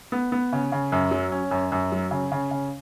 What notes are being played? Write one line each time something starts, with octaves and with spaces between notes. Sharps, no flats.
B3
B3
C#3
C#3
F#2
F#3
C#4
F#2
F#2
F#3
C#3
C#3
C#3